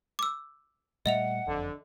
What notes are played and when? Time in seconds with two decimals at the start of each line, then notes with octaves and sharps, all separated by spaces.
0.19 D6 E6
1.06 A#2 G3 A3 D#5 E5 F#5 F7
1.47 F#1 F2 D3